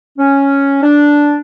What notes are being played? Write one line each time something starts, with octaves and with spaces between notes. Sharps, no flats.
C#4
D4